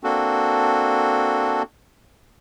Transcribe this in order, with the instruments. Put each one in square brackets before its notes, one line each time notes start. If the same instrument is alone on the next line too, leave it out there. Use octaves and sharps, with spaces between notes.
[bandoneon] A#3 C4 D4 F#4 A4